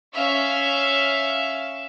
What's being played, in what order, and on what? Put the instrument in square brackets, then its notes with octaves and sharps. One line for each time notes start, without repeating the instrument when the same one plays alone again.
[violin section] C#4 E5 F5